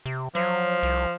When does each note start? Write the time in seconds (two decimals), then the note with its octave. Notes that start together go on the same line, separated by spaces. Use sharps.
0.06 C3
0.35 F3 F#3
0.83 C2